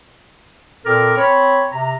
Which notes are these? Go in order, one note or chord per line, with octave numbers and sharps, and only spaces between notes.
A#2 C4 A4 A#4 G5 D6
C4 C#5 B5
C3 A#5